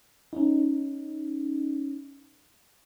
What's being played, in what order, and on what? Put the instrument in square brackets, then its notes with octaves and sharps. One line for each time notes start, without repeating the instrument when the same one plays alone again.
[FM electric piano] C#4 D#4